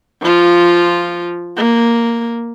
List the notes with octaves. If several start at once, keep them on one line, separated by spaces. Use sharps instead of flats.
F3 F4
A#3